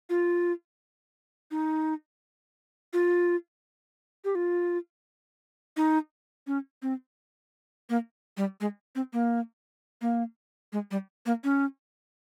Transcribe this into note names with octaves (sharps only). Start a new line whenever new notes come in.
F4
D#4
F4
G4
F4
D#4
C#4
C4
A#3
G3
G#3
C4
A#3
A#3
G#3
G3
A#3
C#4